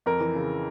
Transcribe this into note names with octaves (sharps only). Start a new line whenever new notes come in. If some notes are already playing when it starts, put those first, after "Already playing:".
F2 A#4
E3
C#3